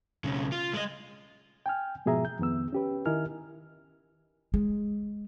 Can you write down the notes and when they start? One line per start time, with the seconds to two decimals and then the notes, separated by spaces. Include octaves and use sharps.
0.24 B1 C#3
0.52 F4
0.74 G#3 D#5
1.66 G5 G#5 F6
2.06 G#2 B2 F3 G#4 E5 A#5
2.25 G6
2.39 F2 D#3 B3 E6
2.73 C#4 G4 B4
3.06 D#3 E4 A#4 D#5 G#5 F6
4.54 G#3